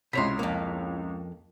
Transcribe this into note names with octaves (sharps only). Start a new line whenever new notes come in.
C#2 C3 E4 C#5 A#5 C6 B6
F2 A#3